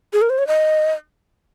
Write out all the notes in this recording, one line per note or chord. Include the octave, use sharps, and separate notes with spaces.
G#4
A#4
C5
C#5
D#5